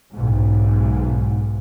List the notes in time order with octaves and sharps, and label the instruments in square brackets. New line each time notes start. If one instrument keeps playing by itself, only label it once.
[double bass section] B1 G#2